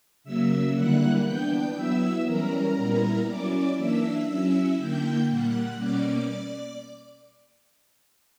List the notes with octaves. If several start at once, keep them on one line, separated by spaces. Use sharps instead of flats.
C#3 F#3 A#3 E5 E6
D3 G3 A#3 E4 F#5 F#6
E3 B3 D4 G5 G6
F#3 B3 E4 E5 E6
E3 G3 C#4 A#4 A#5
A#2 G3 B3 E4
F#3 C#4 E4 D5 D6
E3 A#3 D4 E5 E6
F#3 C#4 E4 E5 E6
D3 A#3 E4 G5 G6
A#2 G3 A#3 F#5 F#6
B2 G3 A#3 C#4 D5 D6